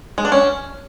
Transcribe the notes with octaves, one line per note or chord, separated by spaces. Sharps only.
G#3
D4
C#4